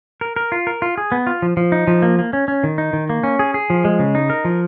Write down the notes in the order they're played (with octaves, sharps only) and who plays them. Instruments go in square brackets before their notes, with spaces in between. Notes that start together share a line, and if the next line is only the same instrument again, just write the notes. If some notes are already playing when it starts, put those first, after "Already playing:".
[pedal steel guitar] A#4
A#4
F4
A#4
F4
G#4
B3
F4
F3
F3
D#4
F3
A#3
A#3
C#4
C#4
D#3
D#4
D#3
A#3
C#4
G#4
G#4
F3
G#3
C#3
D#4
A#4
F3